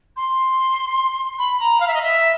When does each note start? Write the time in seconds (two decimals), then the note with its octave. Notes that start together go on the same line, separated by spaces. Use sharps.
0.16 C6
1.38 B5
1.59 A#5
1.80 F5
1.87 E5
1.93 D#5
2.02 E5